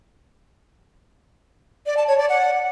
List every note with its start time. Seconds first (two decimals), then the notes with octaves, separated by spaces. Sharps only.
1.86 D5
1.97 A5
2.08 C#5
2.18 D5
2.29 F#5